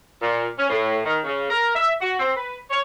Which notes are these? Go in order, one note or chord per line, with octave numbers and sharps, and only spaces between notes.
A#2
C#4
A2
D#3
C#3
A#4
E5
F#4
C4
B4
C#5